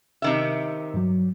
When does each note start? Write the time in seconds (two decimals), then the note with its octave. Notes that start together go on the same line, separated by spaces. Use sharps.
0.22 C3 D#3 E5
0.94 G2 F#3